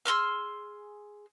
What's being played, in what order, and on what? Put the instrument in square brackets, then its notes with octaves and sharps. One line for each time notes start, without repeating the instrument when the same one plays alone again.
[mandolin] G#4 C6 E6 F6